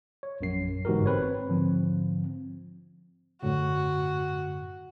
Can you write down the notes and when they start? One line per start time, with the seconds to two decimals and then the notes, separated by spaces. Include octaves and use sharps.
0.23 C#5
0.41 A#1 F#2 C7
0.85 G1 G#2 E3 F#4 G4 A#4
1.06 C4 B4 C#5
1.49 G#2 D3 F3 C4
3.42 F#2 A2 D3 F#4